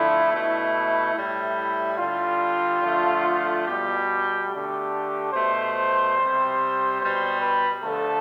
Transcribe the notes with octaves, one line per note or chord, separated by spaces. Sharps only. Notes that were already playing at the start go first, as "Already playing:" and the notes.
Already playing: D3 F3 A3 E4
B2 A3 E4
A2 G3 E4
D3 G3 F4
D3 F3 A3
B2 G3 G4
D3 A3 G4
B2 A3 C5
C3 G3
B2 G3 C5
B4
D3 F3 A3 A4